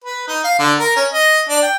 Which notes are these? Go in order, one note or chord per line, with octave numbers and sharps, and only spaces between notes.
B4
D#4
F5
D3
A#4
C#4
D#5
D4
G5